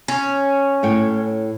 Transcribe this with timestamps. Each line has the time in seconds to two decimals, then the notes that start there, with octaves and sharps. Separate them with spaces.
0.08 C#4
0.83 A2 C#5 G5